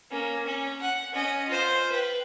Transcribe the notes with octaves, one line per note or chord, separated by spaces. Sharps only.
A#3 C#4
C#4
F#5
C#4 D#5
F4 C5
B4 G5